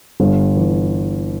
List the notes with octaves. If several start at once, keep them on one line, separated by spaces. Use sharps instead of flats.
G1
E3